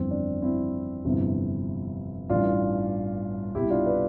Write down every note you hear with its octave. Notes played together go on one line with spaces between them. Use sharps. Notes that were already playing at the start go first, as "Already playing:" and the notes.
Already playing: G1 F2 E3 C4
D4
C4 E4
G1 F2 C3 E3
A1 G2 E3 D4 F4
C2 B2 E4 G4
D4 F4
B4 D5